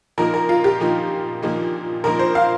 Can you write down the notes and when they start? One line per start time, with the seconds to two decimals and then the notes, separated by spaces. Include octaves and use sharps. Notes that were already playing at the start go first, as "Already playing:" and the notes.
0.18 A#2 F3 A#3 D#4 A#4
0.34 A#4
0.49 F4
0.64 G4
0.80 A#2 F3 A#3 D#4
1.43 A#2 F3 A#3 D#4
2.04 A#2 F3 A#3 D#4 A#4
2.19 C5
2.35 F5